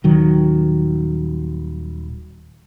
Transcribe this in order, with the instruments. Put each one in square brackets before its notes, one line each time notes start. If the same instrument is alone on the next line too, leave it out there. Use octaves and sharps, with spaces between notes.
[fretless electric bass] D#1 D#3 F#3